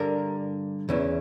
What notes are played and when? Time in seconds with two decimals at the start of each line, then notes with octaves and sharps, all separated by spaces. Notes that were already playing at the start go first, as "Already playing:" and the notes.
Already playing: G2 D3 A#4
0.89 E2 C#3 E3